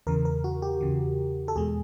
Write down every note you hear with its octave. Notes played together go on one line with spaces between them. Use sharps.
E2 C#3 E3 A#4
A#4
F#4
G4
E2 C#3 E3
A4
E2 B2 G#3 G#4